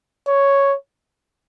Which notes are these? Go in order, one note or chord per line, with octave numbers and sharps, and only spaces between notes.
C#5